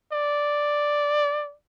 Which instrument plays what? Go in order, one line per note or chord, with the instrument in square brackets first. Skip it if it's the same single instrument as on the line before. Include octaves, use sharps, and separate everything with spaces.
[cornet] D5